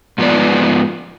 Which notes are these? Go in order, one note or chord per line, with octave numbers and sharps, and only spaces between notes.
G#2 F3 B3 B4 D5